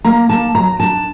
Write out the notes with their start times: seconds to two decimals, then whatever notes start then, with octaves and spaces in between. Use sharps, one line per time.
0.04 A#3 A#5
0.29 A#3 A5
0.55 F#3 A#5
0.80 D4 A5